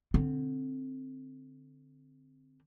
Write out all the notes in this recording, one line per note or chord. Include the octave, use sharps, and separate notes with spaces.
D3 C4